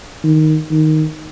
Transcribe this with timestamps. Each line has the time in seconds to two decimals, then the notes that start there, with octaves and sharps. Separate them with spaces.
0.24 D#3
0.71 D#3